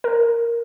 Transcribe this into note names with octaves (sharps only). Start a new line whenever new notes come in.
A#4